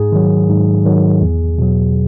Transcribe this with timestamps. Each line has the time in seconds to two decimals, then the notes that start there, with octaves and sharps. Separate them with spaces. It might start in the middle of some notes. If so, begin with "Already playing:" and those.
Already playing: G#2 G#4
0.12 D#3 F#3
0.49 G#2
0.86 D#3 F#3
1.21 E2
1.59 B2 F#3